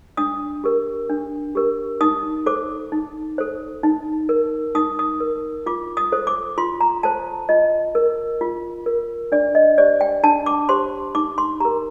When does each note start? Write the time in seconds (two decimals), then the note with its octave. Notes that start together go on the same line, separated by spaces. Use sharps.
0.17 D4 D#6
0.64 G4 A#4
1.10 D4
1.55 G4 A#4
2.01 D#4 D#6
2.46 A4 C5 D6
2.92 D#4
3.38 A4 C5
3.83 D#4
4.29 A#4
4.75 D#4 D#6
4.99 D#6
5.20 A#4
5.66 F4 D6
5.97 D#6
6.12 A4 C5
6.27 D6
6.58 F4 C6
6.81 A#5
7.03 A4 C5 A5
7.49 F4 D#5
7.95 A#4
8.41 F4
8.86 A#4
9.32 D4 D5
9.55 D#5
9.78 G4 C5 D5
10.01 G5
10.23 D4 A5
10.46 D6
10.69 G4 C5 C6
11.15 D#4 D6
11.38 C6
11.60 G4 A#4 A#5